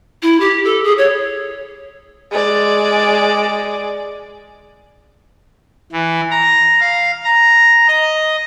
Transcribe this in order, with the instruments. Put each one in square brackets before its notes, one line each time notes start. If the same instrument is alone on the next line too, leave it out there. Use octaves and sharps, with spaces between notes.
[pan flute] E4
G4
A4
G#4
C#5
[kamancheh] G#3 D5
[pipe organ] E3
A#5
F5
A#5
D#5